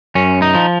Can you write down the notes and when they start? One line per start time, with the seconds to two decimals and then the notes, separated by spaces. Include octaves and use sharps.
0.15 F#2 C#4
0.42 D#4
0.55 F3